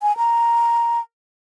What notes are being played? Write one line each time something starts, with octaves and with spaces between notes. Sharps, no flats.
G#5
A#5